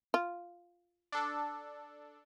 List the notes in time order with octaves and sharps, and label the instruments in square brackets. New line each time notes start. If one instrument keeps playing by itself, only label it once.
[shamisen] F4
[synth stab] D4 A4